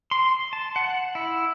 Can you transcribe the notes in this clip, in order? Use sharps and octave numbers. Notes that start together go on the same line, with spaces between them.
C6
A5
F#5
E4